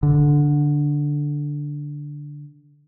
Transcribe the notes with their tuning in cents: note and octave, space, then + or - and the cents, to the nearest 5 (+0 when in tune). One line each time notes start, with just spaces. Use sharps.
D3 -5